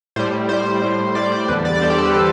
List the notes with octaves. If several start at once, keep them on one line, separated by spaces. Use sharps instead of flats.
A2 G3 C5
A2 G3 C5
A2 G3
A2 G3 D5
C5
E2 D3 G3 B4
D5
D5
E2 D3 G3 C5
G4
A4
B4
D3 A4